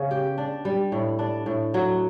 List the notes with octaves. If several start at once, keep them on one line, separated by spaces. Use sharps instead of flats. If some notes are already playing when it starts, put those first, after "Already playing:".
Already playing: C#3 B3
G4
D4
G3
A2
D4
A2
F#3